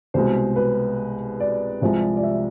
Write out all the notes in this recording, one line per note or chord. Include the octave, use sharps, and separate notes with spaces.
C2 B2 G#3 C5
B4
D5
C2 C3 F3 G#3
D5
E5